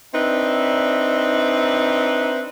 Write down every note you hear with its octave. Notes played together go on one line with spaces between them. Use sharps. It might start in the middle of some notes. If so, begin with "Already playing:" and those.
C4 D4 D#4 B4 E5